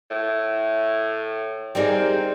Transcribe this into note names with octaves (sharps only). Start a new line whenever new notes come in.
A2
G3 C4 D#4 G#4 A#4 D5 G5